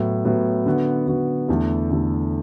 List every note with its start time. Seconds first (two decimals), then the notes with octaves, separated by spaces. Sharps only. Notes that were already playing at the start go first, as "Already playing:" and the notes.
Already playing: A2 F#3 B3
0.25 A2 F#3 B3
0.66 D3 B3 F#4
1.07 D3 B3 F#4
1.48 E2 D3 A3 E4 A4
1.90 E2 D3 A3 E4 A4